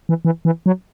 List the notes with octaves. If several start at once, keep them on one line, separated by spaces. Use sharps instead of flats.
E3
E3
E3
F#3